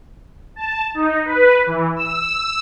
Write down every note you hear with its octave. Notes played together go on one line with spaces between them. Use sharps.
A5
D#4
B4
E3
E6